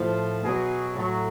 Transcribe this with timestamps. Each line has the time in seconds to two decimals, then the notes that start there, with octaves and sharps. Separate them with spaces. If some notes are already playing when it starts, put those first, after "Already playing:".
Already playing: A2 F3
0.42 B2 F#3 G#4
0.94 A2 F#3